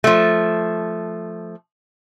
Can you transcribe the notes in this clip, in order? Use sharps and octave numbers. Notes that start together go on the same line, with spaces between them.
F3 A3